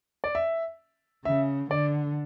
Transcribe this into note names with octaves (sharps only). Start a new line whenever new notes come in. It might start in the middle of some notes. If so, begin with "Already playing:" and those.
D5
E5
C#3 E5
D3 D5